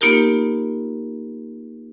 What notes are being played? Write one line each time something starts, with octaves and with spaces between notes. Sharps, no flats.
A#3 B3 D#4 F4 G4 A#4